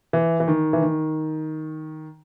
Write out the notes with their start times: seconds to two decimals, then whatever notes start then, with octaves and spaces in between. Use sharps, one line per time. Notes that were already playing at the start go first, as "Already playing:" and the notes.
0.13 E3
0.40 E3
0.48 D#3
0.73 E3
0.82 D#3